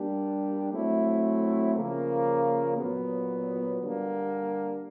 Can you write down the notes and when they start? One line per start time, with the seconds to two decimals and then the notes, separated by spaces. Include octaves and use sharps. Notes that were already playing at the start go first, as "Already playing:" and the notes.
Already playing: G3 A#3 D4 G4
0.72 F#3 A3 C4 E4
1.76 C#3 F3 A#3
2.78 A#2 F#3 B3
3.81 D3 G3 A#3